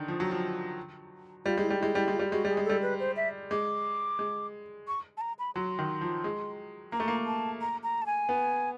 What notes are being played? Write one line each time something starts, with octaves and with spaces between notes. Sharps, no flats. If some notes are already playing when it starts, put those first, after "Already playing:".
Already playing: D3 D#3
F3
F#3
F3
G3 F4
G#3 E4
G3
G#3 E4
G3 E4
G#3
F4
G3
G#3 F#4
G3 G#4
G#3
G3 A4
B4
C5
E5
G#3 D6
G#3
C#6
A5
A#5
B5
F#3 C6
D#3
F3
G#3
A#3 A#5
A3
A#3
A5
A#5
A#5
A5
G#5
B3